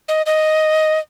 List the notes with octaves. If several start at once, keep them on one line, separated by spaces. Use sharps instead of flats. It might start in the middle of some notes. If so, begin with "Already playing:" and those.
D#5
D#5